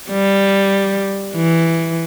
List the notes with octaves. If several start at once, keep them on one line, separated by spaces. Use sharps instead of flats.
G3
E3